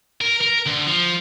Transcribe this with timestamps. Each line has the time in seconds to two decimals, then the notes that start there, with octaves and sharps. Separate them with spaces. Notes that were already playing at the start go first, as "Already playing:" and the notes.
0.21 A#4
0.41 A#4
0.66 D2
0.87 F3